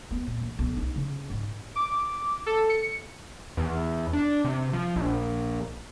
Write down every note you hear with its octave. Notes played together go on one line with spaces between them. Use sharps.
B3
A#2
E3
B1
D#4
C#3
G#2
D6
A4
C#7
E2
D4
C3
F3
A#1